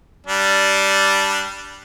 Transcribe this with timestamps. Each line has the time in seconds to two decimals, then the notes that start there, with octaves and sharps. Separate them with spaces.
0.27 G3 D4